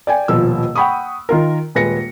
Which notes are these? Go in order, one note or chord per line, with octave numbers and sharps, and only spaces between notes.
D5 G5 G#5
D#1 B2 F3 E6
F#5 G5 B5 C#6 D#6
D#3 F4 A#4
D#1 G#3 B4 A#6 C#7